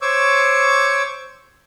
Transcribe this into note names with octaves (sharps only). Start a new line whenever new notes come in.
C5 C#5 C#6 D6 E6